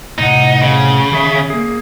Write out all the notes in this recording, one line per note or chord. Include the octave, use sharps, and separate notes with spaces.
A2 C3 D#4 F#5
C#3
D#3 G#4 E5
A#3 G#4